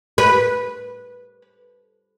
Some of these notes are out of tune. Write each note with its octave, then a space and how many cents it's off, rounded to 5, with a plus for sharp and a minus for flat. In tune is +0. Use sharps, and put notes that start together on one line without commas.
B4 -10